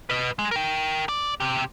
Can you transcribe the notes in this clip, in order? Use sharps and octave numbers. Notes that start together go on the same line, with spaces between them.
B4 D#5
G#3
A#4 G5
D5
C3 G4